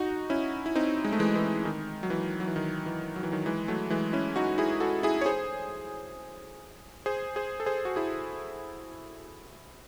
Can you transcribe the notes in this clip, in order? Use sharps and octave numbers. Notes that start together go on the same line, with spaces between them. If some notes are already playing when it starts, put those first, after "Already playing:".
Already playing: D#4 F#4
C#4 E4
E4
C4 D#4
G#3
A3
E3 G#3
E3
D#3
F#3
E3
F#3
E3
D#3
E3
F#3
E3
D#3 F#3
E3 G#3
F#3 A3
E3 G#3
C#4 E4
D#4 F#4
E4 G#4
F#4 A4
E4 G#4
C#5
G#4 C5
G#4 C5
G#4 C5
A4
G#4 C5
F#4
E4 G#4